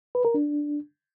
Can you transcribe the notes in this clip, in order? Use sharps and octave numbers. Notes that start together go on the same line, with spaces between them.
B4
A#4
D4